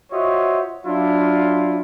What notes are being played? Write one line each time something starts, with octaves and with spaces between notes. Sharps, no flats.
F4 F#4 C5 C#5 D#5 E5
F#3 D4 E4 F4